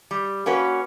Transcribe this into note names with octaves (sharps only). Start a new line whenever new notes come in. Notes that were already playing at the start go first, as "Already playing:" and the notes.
G3
A#3 C#4 F#4 B4